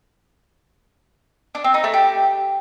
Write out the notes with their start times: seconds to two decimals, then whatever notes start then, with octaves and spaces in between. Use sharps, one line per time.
1.55 D4
1.64 C4
1.74 D#4
1.84 A3
1.94 G4